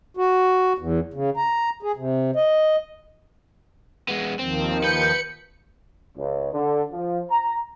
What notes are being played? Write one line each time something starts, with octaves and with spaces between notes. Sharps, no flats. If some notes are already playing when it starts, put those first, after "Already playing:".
F#4
E2
C#3
A#5
G#4
C3
D#5
G#3 B3
D#2 D#3 F3 C4
B4 G6 C#7
C#2
D3
F3
A#5